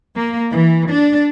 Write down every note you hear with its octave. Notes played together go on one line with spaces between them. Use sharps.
A#3
E3
D4